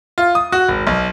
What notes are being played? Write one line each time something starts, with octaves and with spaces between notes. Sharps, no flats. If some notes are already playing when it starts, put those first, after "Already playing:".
F4
D#6
F#4
G#1
B1